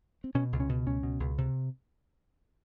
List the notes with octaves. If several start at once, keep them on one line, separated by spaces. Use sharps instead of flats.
C4
B2 C#4
C#2
C#4
B2
C#2 C#4
B2
C#2
C3